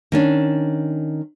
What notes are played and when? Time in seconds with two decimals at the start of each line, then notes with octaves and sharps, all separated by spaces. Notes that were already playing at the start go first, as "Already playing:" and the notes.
0.12 D#3 C#4 D4